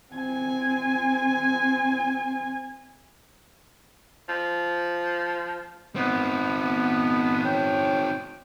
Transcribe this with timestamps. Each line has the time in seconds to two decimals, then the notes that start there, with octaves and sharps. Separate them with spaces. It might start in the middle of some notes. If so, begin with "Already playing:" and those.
0.14 C4 G#5
4.29 F3
5.96 B3 C4 D#4
7.45 C#5 G5